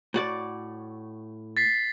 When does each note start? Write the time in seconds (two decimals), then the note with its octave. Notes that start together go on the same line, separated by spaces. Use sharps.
0.14 A2 F#4 D5
1.57 A6 B6 C7